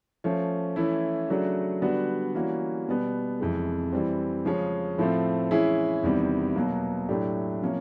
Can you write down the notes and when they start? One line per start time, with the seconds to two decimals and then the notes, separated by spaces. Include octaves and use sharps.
0.24 F3 A3 C#4
0.76 E3 A3 C#4 E4
1.29 C#3 F#3 A3 D4 F#4
1.82 D3 G3 B3 D4 F#4
2.35 E3 G3 A#3 C#4 F#4
2.88 B2 G3 B3
3.40 F2 C3 E3 G#3
3.92 E3 G3 C4
4.45 C#3 F3 G#3 C#4
4.98 A2 F3 A3 C4
5.51 E3 G#3 C#4 E4 G#4
6.03 E2 C3 D#3 G3
6.56 B2 F#3 A#3
7.09 A2 F#3 A3 D4 G4
7.62 C3 F3 A#3 C#4